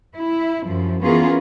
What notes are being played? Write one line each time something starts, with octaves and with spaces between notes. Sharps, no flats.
E4
F#2 F3
E3 B3 C#4 F4 G#4 A#4